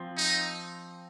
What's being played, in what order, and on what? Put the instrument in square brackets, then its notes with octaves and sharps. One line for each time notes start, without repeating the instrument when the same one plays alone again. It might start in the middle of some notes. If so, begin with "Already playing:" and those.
Already playing: [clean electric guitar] F3 C4
[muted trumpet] D#4